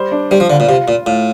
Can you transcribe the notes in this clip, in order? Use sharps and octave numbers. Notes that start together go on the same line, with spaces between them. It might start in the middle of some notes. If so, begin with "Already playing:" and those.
Already playing: G3 C5
D4
G3 C5
F3
D3 F4
A#2
C3 F4
A#2 F4
A2 F4